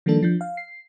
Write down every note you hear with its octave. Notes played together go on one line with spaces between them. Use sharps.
D#3 F3 G3 A#3 D4 A4
F3 D4 G6
F5
C7